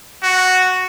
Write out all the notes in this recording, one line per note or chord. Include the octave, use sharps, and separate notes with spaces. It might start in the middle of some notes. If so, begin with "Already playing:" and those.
F#4